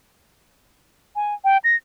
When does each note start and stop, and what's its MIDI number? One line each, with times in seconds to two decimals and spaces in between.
1.16 1.34 80
1.45 1.58 79
1.64 1.76 94